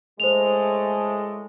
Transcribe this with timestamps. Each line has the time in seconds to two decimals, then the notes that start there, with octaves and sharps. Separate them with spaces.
0.20 A2 G#3 A3 C5 F7